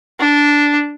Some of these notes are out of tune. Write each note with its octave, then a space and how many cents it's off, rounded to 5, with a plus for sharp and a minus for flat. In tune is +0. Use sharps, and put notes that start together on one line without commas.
D4 -10